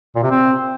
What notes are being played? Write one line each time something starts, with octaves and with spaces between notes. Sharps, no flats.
A#2
C3
C4